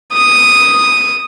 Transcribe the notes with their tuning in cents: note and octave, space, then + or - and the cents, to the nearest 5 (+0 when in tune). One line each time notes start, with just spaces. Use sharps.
D#6 -5